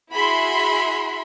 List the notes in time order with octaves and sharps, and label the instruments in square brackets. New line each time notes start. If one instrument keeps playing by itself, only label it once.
[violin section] E4 F#4 G#4 E5 B5 C6